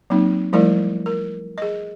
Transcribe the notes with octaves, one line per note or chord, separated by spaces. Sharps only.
F#3 A#3 C4 D#4
F3 G3 A3 E4 A#4 D5
A#4
G#4 D#5